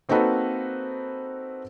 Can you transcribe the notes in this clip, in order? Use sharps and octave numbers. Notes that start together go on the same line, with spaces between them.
A#3 C4 D#4 F#4 A4 B4